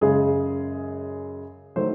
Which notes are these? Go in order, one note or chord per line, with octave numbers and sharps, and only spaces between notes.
F#2 C#3 G#3 G#4
D#3 F#3 A3 C5